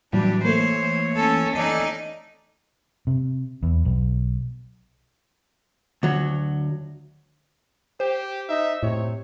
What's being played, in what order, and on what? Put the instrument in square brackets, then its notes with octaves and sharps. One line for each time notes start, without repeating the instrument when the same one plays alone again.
[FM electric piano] A2 F#3 [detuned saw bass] E3 [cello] G3 [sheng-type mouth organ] D4
[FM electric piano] A3 A#3 [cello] C5 [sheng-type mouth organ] C#5
[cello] C#4 A4
[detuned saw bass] E3 [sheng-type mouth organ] C#4 A4 D5 [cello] D#4 D#5
[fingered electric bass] C3
E2
B1
[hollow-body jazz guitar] D2 F#3
[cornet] G4 [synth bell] C5
[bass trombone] D#4 [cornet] E5
[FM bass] A2 [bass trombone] C3 [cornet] C#5